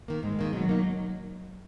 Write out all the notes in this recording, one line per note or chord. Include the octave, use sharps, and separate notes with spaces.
D#3 A#3
G#2 G#3
D#3 A#3
B2 F#3
A#3 D#4